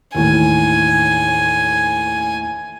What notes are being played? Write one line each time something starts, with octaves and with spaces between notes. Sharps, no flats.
D#2 A2 E3 G#5